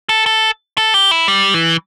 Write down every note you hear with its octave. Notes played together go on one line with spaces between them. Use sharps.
A4
A4
A4
G4
E4
G3
E3